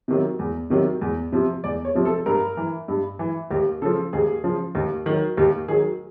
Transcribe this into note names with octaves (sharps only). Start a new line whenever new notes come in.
C3 D#3 F#3
E2
C3 D#3 F#3
E2
C3 F3
E2 D5
C#5
C3 F3
A4
G2 A#4
E3
G2
E3
D#2 G4
C#3 F3 A4
D#2 G#4
C#3 F3
D#2
D#3 F#3
D#2 G4
D#3 F#3 G#4